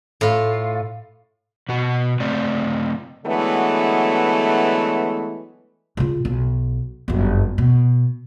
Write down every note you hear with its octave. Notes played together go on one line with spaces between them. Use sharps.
A2 F4
B2 F#4
C#3 A3 C4 D5
D3 E3 F#3 G#3 A3 B3
C#3 F4
B1
G1 F#2
B2